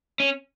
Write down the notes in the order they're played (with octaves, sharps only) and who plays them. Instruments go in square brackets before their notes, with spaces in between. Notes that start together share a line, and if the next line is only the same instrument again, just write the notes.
[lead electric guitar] C#4